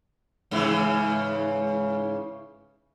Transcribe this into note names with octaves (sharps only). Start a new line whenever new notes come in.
G#2 C#3 E3